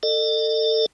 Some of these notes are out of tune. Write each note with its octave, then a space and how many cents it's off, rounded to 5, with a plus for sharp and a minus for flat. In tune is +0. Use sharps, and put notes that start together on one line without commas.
A4 +25 D#5 -35